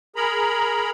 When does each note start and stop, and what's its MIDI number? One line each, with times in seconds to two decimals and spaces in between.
0.16 0.91 68
0.16 0.91 70
0.16 0.91 82
0.16 0.91 83